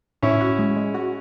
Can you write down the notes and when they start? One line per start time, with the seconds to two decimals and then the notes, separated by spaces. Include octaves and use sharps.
0.22 A2 C#4 E4
0.41 F#4
0.59 G#3
0.76 G#3
0.94 F#4